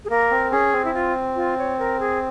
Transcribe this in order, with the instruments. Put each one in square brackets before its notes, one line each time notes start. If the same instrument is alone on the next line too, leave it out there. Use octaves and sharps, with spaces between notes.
[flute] G#4
[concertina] A#3 [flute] A#4
[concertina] C4
[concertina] C#4 [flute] G#4
[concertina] C4
[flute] E4
F4
F4
C#5
A#4
G#4